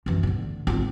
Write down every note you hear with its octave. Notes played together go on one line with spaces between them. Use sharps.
F#2 E3
A2 D3
G#1 F4